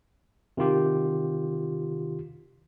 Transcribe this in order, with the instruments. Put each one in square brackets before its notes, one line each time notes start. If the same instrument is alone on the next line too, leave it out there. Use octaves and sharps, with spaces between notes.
[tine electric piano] C3 D#3 F4 G4